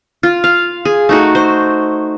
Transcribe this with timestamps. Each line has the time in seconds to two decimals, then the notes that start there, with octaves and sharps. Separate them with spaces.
0.23 F4
0.44 F5
0.85 G#4
1.09 A3 D#4 F#4
1.35 C5